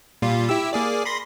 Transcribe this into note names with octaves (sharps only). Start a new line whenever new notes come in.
A#2 G3 F4
E4 G4 E6
A#3 G#4 D5
B5 C6 A#6